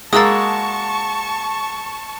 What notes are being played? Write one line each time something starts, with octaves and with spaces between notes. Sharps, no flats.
G#3 A#3 F#4 A5 C#6 D#6 E6 A6